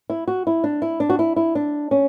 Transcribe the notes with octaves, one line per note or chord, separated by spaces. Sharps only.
E4
F#4
E4
D4
E4
D4
F#4
E4
E4
D4
C#4